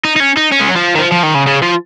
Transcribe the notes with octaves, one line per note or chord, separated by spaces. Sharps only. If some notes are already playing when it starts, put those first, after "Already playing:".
D#4
D#4
C#4
D#4
C#4
G#3
F#3
F3
D#3
F3
F3
D#3
C#3
C#3
F3